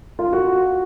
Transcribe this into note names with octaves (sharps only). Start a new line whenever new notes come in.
F4
F#4